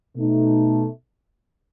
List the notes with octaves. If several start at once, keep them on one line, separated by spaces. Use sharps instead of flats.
B2 A3 D#4